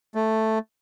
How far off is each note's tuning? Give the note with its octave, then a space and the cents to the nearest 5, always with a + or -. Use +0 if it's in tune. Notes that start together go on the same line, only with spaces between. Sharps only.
A3 +0